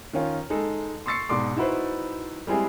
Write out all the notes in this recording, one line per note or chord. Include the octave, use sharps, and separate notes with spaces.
D#3 C#4 F4
G#3 D#4 A4
C6 C#6 E6 A6 C7 C#7
G#2 B2 D5 C6 D6
D#4 E4 F#4 B4 C5
G3 G#3 C4 E4 G#4